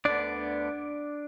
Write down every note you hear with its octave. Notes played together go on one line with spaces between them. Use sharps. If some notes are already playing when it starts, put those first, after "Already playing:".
D2 D3 B3 D4 D5